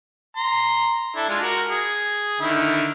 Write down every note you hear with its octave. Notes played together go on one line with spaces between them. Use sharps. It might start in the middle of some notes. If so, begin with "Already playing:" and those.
A#5 C6
D4 E4 A4
G#3 D4 F4
F#4 A#4
G#4
D3 D#3 E4